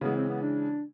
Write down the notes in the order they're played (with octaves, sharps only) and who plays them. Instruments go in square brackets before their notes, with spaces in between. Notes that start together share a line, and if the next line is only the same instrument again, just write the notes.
[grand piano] C#3 E3 G#3 [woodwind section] B3
[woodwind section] C4
B3
D4